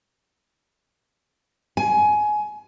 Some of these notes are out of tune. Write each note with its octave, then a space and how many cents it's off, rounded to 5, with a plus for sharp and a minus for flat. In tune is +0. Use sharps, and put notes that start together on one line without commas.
G#5 +20